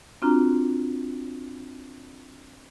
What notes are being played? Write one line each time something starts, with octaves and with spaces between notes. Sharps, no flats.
C4 D4 F4 F#4 A#5